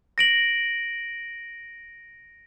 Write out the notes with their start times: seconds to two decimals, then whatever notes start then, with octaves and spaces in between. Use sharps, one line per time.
0.18 A#6 D7 F#7